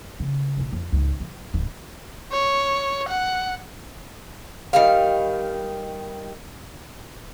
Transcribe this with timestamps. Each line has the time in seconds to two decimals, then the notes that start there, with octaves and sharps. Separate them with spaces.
0.20 C#3
0.57 A#1 B2
0.72 F2
0.92 C#2 G#2
1.20 F#3
1.54 D1
2.32 C#5
3.09 F#5
4.73 D#3 G3 F5